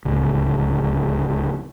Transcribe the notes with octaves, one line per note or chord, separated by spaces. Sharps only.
D1 C#2